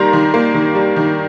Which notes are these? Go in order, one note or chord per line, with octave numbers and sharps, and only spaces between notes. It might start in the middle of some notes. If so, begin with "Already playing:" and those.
Already playing: D#3 G3 A#3 A#5 C6
D#3
A#3
D#3
G3
D#3